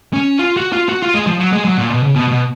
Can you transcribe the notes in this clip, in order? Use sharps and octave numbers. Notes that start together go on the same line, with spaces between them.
C#4
F4
F#4
F4
F#4
F4
G#3
F3
F#3
G#3
F#3
A#2
B2
C#3
B2
B2